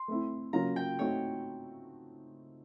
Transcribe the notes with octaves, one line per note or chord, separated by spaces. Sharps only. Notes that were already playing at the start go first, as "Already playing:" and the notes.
Already playing: C6
A3 C4 E4
C#3 F#3 A#3 C#4 F4 A#5
G5
A3 C4 D#4 F#4 C#5